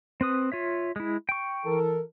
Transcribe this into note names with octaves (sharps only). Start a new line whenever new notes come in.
C4 B4 D#6
F4 C#5 E5
G#3 E4
G5 C#6
E3 A4 A#4